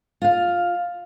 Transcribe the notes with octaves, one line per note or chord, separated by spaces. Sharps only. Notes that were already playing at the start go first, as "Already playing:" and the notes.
F4 F5